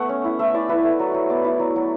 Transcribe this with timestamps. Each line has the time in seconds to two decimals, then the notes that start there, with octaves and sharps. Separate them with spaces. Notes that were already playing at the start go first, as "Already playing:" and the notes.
Already playing: A3 B3 E5 F#5
0.09 C#4
0.24 E4
0.39 A3 E5
0.54 E4 D5
0.69 E4 B4
0.84 A3
0.99 F#3
1.14 F#3
1.29 B3 D5
1.44 E4
1.59 F#3
1.76 F#3